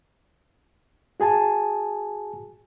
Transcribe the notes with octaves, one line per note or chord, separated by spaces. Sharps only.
F#4 G#4 G#5 A5